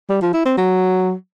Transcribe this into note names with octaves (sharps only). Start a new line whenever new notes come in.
G3
F3
E4
C4
F#3